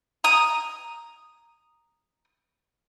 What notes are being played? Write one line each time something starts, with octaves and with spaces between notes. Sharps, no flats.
A#5 D#6